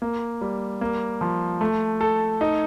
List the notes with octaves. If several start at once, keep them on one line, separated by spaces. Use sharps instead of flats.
A#3
G3
A#3
F3
A3
A4
D#4